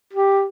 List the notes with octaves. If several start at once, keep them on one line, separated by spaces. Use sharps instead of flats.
G4